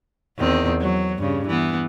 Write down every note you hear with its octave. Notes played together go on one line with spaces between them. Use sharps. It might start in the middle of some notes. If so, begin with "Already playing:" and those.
E2 D#3 C4
F#3
G2 C#3
E3 B3